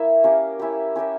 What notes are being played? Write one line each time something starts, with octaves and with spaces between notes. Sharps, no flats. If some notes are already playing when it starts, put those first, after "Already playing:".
Already playing: A#3 E4 E5
C#4 G4 A#4 F5
C#4 E4 G4
C#4 G4 A#4 E5